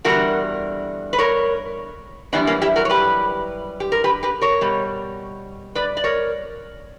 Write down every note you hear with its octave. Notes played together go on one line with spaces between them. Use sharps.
E2 D3 G3 F#4 A#4
B4
A#4 C#5
F#2 E3 G3 B3 D4
A#3 C#4
E4 G4
F#4 A#4
C#5
G4 B4
G4
A#4
G4 B4
G4 B4
A#4 C#5
B2 G3
B4 D5
D5
A#4 C#5